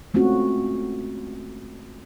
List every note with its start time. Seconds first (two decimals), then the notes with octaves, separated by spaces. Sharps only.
0.14 G#3 A3 C4 C#4 F4 F#4